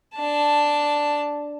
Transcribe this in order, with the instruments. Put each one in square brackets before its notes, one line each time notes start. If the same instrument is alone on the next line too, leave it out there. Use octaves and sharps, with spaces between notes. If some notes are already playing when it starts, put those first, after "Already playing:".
[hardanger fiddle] D4 A5